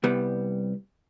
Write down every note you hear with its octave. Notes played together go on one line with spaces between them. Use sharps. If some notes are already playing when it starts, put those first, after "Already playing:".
C2 G3 B3